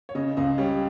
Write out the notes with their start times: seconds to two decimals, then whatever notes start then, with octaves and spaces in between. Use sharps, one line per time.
0.09 C#5
0.15 C#3 D#5
0.37 C#2 D#5
0.58 G3 C#5